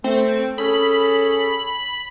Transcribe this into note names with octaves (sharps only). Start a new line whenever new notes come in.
A3 C4
C#4 G#4 A4 B5